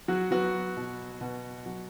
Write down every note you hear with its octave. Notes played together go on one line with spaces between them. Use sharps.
F#3 F#4
F#3 B3 F#4
B2
B2
F#3